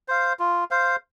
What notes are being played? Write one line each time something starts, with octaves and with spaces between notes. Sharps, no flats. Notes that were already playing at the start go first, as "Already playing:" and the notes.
C5 F5
F4
C5 F5